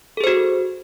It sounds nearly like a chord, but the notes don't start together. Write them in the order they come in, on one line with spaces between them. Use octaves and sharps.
A4 G#4 C5 F#4